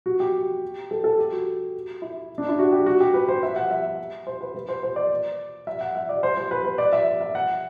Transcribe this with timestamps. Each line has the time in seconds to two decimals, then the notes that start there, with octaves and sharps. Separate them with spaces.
0.06 F#4
0.20 G4
0.91 A4
1.04 A4
1.19 G4
1.32 F#4
2.02 E4
2.38 D4
2.48 E4
2.59 F#4
2.72 G4
2.86 F#4
3.00 G4
3.14 B4
3.28 C5
3.43 E5
3.56 F#5
3.71 E5
4.27 C5
4.41 B4
4.55 B4
4.69 C5
4.83 C5
4.96 D5
5.67 E5
5.81 F#5
5.95 E5
6.09 D5
6.23 C5
6.37 C5
6.51 B4
6.65 B4
6.78 D5
6.93 E5
7.21 E5
7.35 F#5